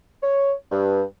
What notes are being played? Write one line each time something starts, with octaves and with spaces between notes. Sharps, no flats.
C#5
G2